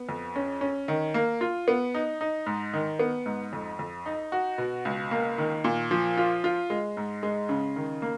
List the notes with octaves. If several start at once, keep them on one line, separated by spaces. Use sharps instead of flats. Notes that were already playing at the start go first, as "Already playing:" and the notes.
Already playing: B3
F2
C#4
C#4
D#3
A#3
F4
B3
D#4
D#4
G#2
D#3
B3
G#2
F2
F2
D#4
F#4
B2
C#2
A#3
D#3
A#2
F3
F4
F4
G#3
G#2
G#3
C#3
D#3
A#3